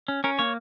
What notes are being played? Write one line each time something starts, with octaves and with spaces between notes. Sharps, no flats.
C#4
C#4 A#4
A#3 C#5